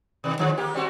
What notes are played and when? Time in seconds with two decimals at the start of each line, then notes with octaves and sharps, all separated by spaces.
0.24 B2 D#3
0.39 D3 F3 G#3
0.57 A#3 G4
0.74 G3 C4 F#4